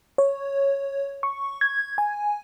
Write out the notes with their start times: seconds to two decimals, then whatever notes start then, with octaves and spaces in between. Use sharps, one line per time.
0.18 C#5
1.23 C#6
1.61 G#6
1.98 G#5